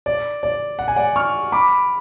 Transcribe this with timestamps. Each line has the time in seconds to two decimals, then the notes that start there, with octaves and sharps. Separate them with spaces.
0.06 D5
0.43 D5
0.79 F#5
0.88 G#5
0.96 D5 F#5
1.16 C#6 F6
1.52 B5 D6